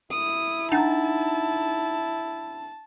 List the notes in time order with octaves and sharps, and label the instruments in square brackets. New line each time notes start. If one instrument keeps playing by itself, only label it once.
[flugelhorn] E4 [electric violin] D#6
[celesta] D4 F#5 A6 [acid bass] D#4 [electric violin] A5